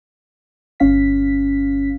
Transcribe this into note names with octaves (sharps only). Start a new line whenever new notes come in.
G1 C#4 F5 B6